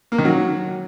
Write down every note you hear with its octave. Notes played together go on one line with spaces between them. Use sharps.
A#3
D#3
F#3